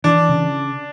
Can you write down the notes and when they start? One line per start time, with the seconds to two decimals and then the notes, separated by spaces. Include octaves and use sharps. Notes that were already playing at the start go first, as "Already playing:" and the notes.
0.04 E3 D4
0.29 C#3